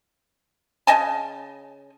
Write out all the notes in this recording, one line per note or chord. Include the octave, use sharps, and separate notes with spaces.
C#3 D#5 G#5 A5